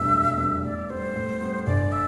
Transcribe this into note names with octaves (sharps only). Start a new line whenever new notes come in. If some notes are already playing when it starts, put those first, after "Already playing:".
Already playing: F1 E2 B2 G3 D4 E5
F1
E2 B2 G3 D4
A2 D5
G3 B3 C5
A2
G3 B3
G1 D5
E5